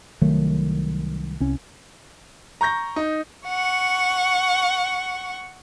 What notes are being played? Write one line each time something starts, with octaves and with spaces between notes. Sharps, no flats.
C2 D#3 F#3 A3
C2 C#4
A#5 C#6 G6 A#6
D#4
F#5 C#6